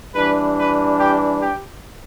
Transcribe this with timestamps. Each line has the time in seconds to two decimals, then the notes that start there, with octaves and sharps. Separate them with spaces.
0.15 E3 G3 D4 B4
0.57 B4
1.00 G4
1.42 G4